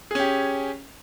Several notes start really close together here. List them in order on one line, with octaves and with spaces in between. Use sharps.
G#4 C#4 G4